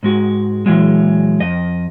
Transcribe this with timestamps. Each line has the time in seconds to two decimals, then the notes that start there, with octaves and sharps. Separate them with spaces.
0.03 G#2 G#3 F#4
0.66 A#2 C#3 E3 F#3 G#3
1.40 F2 D#5